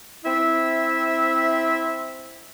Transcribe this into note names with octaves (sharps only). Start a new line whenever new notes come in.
C4 E4 E5